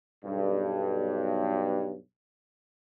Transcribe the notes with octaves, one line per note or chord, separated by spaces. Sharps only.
B1 G2